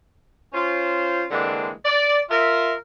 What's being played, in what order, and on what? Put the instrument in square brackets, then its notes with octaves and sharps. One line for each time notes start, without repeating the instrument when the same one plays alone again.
[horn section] C#4 F4 C5
D3 E3 G#3 A#3 C4 D4
D5
F4 A#4 E5